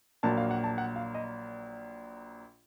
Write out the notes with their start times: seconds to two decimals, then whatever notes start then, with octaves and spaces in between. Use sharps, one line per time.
0.23 A#1 A#2 F#3 A#3 A5
0.37 F5
0.51 F#5
0.64 A5
0.78 F#5
0.96 F5
1.14 D#5